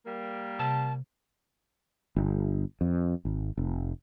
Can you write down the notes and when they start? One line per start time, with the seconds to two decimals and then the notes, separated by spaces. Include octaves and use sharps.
0.06 G3 A#3
0.59 C3 A5
2.16 G1
2.81 F2
3.25 G#1
3.57 F1